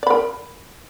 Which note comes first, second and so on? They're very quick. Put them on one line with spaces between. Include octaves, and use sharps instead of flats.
D5 B5 A#4